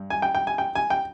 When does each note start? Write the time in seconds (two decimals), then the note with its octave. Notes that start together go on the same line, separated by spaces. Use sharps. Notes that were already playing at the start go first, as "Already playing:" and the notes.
Already playing: G2
0.10 G#5
0.22 G5
0.35 G5
0.47 G#5
0.58 G5
0.75 G#5
0.90 G5